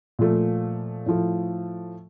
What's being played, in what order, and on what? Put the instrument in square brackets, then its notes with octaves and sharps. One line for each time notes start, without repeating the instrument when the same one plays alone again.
[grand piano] A#2 F3 A3
A2 F3 A3